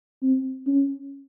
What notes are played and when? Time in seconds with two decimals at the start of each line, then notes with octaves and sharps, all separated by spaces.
0.22 C4
0.67 C#4